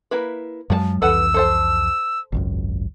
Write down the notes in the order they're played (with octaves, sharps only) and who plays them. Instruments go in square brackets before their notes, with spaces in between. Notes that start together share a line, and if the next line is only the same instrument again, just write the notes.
[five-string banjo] A#3 E4 B4
[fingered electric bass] F#2 F#3 G#3 [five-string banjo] F3 G#4 A5
[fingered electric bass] C2 F2 E3 [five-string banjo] A4 B4 F#5 [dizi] E6
[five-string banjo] A4 C5 A5
[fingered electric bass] G#1 C#2 F#2